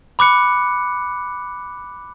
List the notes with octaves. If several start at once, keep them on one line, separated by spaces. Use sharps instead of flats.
B5 D6 F#6 C#7